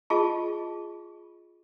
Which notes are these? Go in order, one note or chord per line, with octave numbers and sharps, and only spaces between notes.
F4 G#4 D#5 A5 C#6